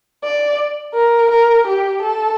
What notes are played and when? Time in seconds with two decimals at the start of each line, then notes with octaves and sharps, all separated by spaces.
0.24 D5
0.94 A#4
1.30 A#4
1.67 G4
2.02 A4